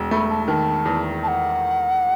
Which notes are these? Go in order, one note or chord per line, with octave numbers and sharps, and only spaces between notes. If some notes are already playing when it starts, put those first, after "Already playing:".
Already playing: E1
A3 B5
A5
D#3 A5
E2
A5
F#5